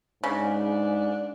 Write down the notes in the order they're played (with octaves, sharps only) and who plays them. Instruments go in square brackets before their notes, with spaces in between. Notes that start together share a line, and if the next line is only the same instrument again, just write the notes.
[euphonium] G#2 [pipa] C#3 [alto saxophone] D4